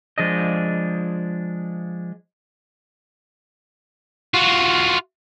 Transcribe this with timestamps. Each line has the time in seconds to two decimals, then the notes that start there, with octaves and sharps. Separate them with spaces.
0.18 F3 G#3 D4 D#5
4.34 F4 F#4